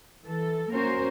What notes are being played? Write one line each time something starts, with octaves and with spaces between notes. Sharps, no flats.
E3 A4
A#3 C#4 F#4 A#4 C5